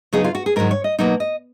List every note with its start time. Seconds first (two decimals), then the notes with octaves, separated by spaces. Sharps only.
0.13 C#3 F#3 B3 D#4 G#4
0.24 F4
0.35 F#4
0.46 G#4
0.56 G#2 D#3 F#3 A#4
0.71 C#5
0.84 D#5
0.99 B2 F#3 A#3 D#4
1.20 D#5